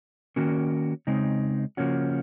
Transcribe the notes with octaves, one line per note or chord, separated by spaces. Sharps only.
D#3 A#3 C#4 F#4 A#4
C#3 G#3 C4 D#4
C#3 F3 A#3 C#4 F#4